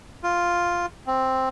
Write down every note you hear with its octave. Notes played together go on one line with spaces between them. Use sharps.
F4
C4